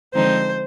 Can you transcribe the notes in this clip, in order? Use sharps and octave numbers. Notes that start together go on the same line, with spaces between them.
D3 F3 G#3 C4 D#4 C5